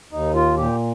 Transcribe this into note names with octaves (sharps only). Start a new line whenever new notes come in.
D#2 D#4
F4
A#2 G4